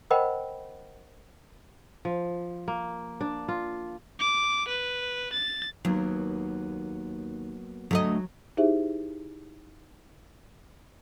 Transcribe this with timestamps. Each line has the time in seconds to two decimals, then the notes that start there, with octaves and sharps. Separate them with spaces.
0.10 A#4 C5 D#5 F#5 G5 B5
2.05 F3
2.68 A#3
3.21 D4
3.48 F4
4.19 D6
4.68 B4
5.33 A6
5.85 D#2 F#3 A#3 B3
7.91 D2 F#3 A3 D#5
8.57 D#4 E4 G4 G#4 C5 E5